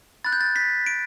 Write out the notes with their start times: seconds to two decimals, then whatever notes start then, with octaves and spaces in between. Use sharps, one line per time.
0.24 B5 F#6 A6
0.33 G6
0.41 A6
0.56 B6
0.86 D7